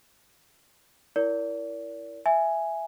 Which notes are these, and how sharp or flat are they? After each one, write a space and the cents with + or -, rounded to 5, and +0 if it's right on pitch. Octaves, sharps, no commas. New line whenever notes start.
E4 +0 A#4 +0 D5 -35
E5 +5 G#5 +0